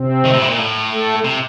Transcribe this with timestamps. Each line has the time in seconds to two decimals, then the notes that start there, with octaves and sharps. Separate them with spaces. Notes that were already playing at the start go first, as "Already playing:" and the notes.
Already playing: C3 C4
0.25 D#3
0.33 A2
0.42 C3
0.49 A#2
0.59 A2
0.91 A3 A4
1.24 C3